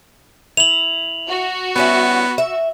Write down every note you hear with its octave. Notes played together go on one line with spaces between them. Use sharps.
E4 F7 F#7
F#4
G3 B3 C#4 E4
E5